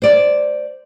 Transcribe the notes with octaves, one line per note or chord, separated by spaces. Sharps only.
C5 D5